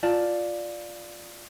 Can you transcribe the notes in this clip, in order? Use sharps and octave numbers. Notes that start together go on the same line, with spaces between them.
F4 D5 A5